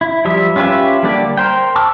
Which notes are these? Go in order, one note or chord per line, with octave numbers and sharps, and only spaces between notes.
E4
F3 G3 E5
C#4 F4 G4 B4 E5
D3 G3 A#3 G4 D5
A#4 C5 G5
A5 C#6 D6 E6 F6